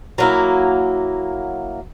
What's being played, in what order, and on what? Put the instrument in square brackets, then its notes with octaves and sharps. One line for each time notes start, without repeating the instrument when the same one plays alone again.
[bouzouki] F#3 A#3 E4